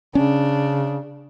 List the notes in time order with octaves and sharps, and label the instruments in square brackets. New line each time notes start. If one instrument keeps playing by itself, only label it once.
[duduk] C#3 [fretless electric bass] C#4 [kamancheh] D4